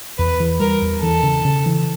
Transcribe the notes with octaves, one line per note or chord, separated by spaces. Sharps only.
E2 B4
E3
G3 A#4
E2
E3 A4
C#3
C#3
E3